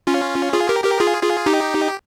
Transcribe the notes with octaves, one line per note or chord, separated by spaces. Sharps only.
C#4 F4
F4 G#4
G4 A#4
G4 A#4
F4 G#4
F4 G#4
D#4 G4